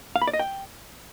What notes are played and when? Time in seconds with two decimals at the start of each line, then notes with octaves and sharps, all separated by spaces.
0.16 F5
0.22 B5
0.28 D5
0.33 D#5
0.39 G5